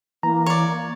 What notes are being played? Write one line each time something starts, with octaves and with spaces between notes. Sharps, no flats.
E3 A#3 A#5
C#5 D5